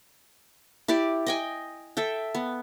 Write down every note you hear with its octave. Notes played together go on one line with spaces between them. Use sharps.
E4 G4 D5
D#5 G5 G#5
A4 E5 G5
B3